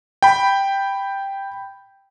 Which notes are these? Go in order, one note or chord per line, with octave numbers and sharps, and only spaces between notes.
G5 B5